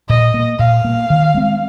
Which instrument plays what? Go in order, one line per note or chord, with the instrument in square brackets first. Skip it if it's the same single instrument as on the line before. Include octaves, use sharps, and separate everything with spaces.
[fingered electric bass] A#2 [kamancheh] D#5
[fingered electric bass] A#3
[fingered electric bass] A#2 [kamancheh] F5
[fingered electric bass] A#3
D#3
G#3 C4